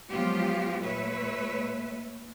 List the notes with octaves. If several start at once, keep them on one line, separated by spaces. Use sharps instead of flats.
F3 F#3 G#3 B3 F4 G4
A#2 A3 B4 C#5 E5